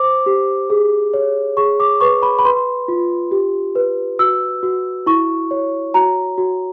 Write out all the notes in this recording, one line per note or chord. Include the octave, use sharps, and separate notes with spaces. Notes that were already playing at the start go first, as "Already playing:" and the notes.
Already playing: C5 D6
G4
G#4
C#5
G#4 C#6
D6
B4 C#6
B5
B5
B4 C6
F4
G4
B4
F#4 E6
F#4
E4 C#6
C#5
F#4 A#5
F#4